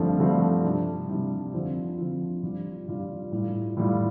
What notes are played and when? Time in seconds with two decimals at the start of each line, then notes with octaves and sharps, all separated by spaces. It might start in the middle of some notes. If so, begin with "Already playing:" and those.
Already playing: G2 D3 F3 A3 C4
0.19 G2 D3 F3 A3 C4
0.64 C3 G3 D4
1.09 C3 G3 D4
1.53 D3 F3 C4 F4
1.98 D3 F3 C4 F4
2.43 G2 G3 F4
2.88 G2 G3 F4
3.32 A2 G3 F4
3.77 A2 G3 F4